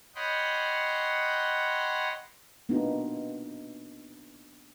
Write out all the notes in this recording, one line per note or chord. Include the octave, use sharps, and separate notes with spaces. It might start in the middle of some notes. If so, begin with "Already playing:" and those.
C#5 D#5 F#5 G5 B5 C6
A#3 B3 D4 D#4 F4 F#4